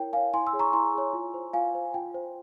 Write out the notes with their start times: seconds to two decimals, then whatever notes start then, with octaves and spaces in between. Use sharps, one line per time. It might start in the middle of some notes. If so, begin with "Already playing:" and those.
Already playing: E4 A#4 C#5 G5
0.13 A#4 C#5 F5 G#5
0.34 E4 G#5 C6
0.47 C6 E6
0.53 G#4 C#5
0.60 A#5 C#6
0.73 E4 G#5 C6
0.94 G#4 C#5
1.13 F4
1.34 C5
1.53 F4 F5 G#5
1.75 C5
1.94 F4 G5
2.15 C5